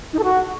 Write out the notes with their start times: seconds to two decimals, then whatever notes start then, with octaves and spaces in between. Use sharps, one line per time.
0.12 D#4
0.18 A4
0.23 F#4